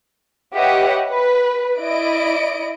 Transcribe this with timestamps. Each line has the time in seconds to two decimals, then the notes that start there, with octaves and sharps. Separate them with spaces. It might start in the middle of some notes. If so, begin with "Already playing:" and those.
0.55 G4 B4 C#5 D#5 E5 F#5
1.10 B4
1.79 E4 D5 D#5 D7